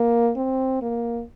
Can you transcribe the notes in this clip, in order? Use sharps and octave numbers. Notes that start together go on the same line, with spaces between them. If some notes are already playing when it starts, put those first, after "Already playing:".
Already playing: A#3
C4
A#3